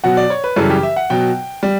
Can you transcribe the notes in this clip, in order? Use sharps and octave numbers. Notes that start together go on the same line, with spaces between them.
B2 F#3 F#5
D5
C#5
B4
F#2 C#3 E3 G3 A4
G4
E5
F#5
B2 F#3 G5
G3